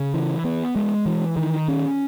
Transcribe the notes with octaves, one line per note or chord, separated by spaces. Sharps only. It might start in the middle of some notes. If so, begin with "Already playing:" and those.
Already playing: C#3
E3
B3
G#3
E3
D#3
C#4